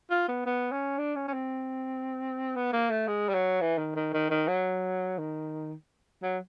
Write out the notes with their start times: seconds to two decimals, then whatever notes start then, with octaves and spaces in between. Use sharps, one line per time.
0.10 F4
0.28 B3
0.45 B3
0.71 C#4
0.98 D4
1.16 C#4
1.28 C#4
1.33 C4
2.55 B3
2.73 A#3
2.90 A3
3.07 G#3
3.29 G3
3.34 F#3
3.61 E3
3.78 D#3
3.96 D#3
4.14 D#3
4.30 D#3
4.48 F#3
5.18 D#3
6.22 F#3